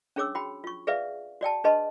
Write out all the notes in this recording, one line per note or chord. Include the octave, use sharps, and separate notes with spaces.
C#4 D4 G#4 C#5 D6 E6
F#4 G5 B5
F4 C#6
G#4 B4 D5 E5 F5
F#4 D5 G5 A5
D4 G#4 B4 D#5 A5 C6